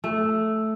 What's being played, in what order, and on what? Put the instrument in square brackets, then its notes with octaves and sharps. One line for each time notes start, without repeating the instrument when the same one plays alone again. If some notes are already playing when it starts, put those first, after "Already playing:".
[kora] A3